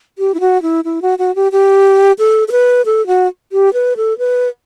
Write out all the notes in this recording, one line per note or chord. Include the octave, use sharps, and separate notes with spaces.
G4
E4
F#4
E4
E4
F#4
F#4
G4
G4
A4
A4
B4
A4
F#4
G4
B4
A4
B4